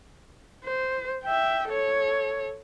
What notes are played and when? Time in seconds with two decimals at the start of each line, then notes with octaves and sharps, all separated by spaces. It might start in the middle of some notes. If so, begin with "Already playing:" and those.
0.65 C5
1.24 E5 G5
1.68 A4 C#5